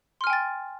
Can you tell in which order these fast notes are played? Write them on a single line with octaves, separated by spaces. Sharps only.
C6 F6 G#5 G5 A6